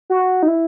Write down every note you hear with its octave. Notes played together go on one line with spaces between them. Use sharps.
F#4
D#4
E4